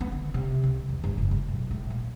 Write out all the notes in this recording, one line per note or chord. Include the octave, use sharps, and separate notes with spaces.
B3
D3
C3
C2
E2
G1
F#1
A2
B1
A2
A#2